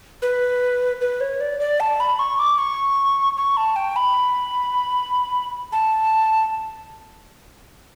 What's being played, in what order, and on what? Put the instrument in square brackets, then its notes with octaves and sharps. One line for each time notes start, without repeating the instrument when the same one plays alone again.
[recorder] B4
B4
C#5
D5
D5
A5
B5
C#6
D6
C#6
C#6
A5
G5
B5
A5